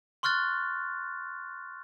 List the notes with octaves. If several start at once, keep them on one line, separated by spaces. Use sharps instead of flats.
C6 C#6 F6 F#6 A6